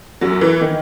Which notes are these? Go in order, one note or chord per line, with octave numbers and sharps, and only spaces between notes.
F#2 F#3
E3
D#3